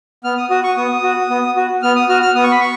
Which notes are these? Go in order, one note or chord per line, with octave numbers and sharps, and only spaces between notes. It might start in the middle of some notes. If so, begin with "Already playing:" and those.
B3 F6
D#6
F#4 D#6
C#6
B3 D#6
F#4
B3
F#4
B3 F6
D#6
F#4 F6
F6
B3 D#6
C#6
B5
C#6